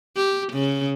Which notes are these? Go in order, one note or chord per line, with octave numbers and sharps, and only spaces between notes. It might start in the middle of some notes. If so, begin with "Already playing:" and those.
G4
C#3